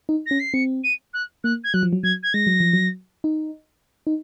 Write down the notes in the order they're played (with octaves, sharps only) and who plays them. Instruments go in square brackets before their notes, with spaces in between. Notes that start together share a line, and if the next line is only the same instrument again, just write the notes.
[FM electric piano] D#4
[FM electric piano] C#4 [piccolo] A#6
[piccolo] C7
[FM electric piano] C4 [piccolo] C#7
[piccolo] D#7
F#6
[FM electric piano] A#3 [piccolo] F#6
[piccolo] G#6
[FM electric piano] F#3 [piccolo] F#6
[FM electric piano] F3
F#3
[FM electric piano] F#3 [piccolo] G#6
[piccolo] G#6
[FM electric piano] G#3 [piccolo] A#6
[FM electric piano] F#3
F3
F#3
D#4
D#4